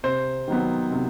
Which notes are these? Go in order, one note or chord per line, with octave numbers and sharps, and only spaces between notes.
C3 C5
D#3 F#3 B3
C3